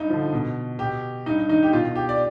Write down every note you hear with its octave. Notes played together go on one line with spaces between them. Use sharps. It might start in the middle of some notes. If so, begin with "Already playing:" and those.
Already playing: G2 D#4
D3 F3
B2
B2 G4
G2 D#4
D#3 D#4
G4
B2 F4
G4
D5